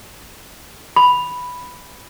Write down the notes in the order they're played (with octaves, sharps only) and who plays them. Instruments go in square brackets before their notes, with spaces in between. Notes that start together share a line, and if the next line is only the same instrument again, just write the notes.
[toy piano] B5